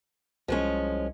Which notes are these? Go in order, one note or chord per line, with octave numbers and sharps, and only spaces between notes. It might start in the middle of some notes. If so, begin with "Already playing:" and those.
C2 F3 G#3 C#4